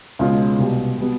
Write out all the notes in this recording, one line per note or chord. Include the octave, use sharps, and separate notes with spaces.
C#2 B2 G#3 C#4 F4
C2 B2 G3
B2 G3 B3